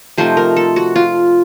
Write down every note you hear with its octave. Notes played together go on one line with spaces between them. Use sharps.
C3 F3 A3 D#4 C5
A#4
A4
F#4
F4